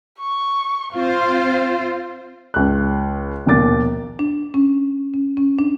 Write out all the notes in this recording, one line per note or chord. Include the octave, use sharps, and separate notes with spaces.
C#6
C4 F4 C5 F5
C#2 F#6
A#1 D#2 B2 A#3 D6 A6
D4
C#4
C#4
C#4
D4